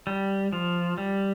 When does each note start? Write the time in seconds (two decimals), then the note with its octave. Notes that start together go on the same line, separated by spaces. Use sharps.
0.07 G3
0.53 F3
0.98 G3